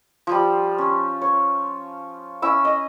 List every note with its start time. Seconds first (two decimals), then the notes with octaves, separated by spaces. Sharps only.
0.27 F3 G3
0.78 C#4
1.21 C#5
2.42 C#4 E4 E6
2.65 D#5